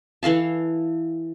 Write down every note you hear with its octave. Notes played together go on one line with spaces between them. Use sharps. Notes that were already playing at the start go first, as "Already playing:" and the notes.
E3 A4 F5 A5